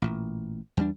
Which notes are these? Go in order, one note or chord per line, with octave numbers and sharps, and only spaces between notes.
A1 A#2
E2 G3 D4